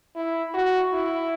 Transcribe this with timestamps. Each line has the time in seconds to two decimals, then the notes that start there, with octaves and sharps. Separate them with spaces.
0.15 E4
0.54 F#4
0.93 E4